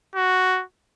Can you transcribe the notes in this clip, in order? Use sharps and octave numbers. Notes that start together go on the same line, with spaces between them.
F#4